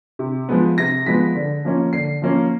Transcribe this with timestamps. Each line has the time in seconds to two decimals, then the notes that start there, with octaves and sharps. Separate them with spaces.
0.19 C3
0.49 F3 G#3 B3
0.78 C3 A#6
1.06 F3 G#3 B3 B6
1.35 D3
1.65 F3 A#3 C#4
1.93 D3 C7
2.22 F3 A#3 C#4